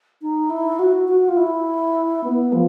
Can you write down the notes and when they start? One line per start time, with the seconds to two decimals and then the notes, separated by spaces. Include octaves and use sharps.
0.22 D#4
0.50 E4
0.79 F#4
1.08 F#4
1.29 F4
1.37 E4
2.24 B3
2.53 F3